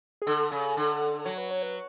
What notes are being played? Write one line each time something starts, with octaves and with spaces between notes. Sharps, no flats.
G#4
D3 A4
C#3
D3
F#3 C#5
B4
C#5
B4